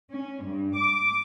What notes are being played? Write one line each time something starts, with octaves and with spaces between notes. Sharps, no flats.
C#4
G2
D6